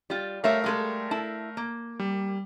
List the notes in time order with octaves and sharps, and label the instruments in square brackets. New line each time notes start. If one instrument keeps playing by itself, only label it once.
[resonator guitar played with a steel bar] G3 F4
[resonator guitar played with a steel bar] G3 C#5 E5 [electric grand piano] A3 A#4 F5
[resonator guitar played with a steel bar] G3 G#3 A4
E4 A5
A#3
[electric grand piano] G3